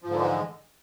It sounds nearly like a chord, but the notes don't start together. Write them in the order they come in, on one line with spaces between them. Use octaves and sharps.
F3 G#2 D3 E3 G#3